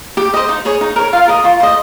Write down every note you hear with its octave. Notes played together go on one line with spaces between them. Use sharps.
G4
C5 D#5
D#4
G#4 C#5
D#4
A#4 C#5
F4 F5
A#4 D#5
F4 C#6
C5 D#5